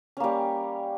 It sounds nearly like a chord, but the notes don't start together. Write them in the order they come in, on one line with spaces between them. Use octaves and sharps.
C#4 A#3 G3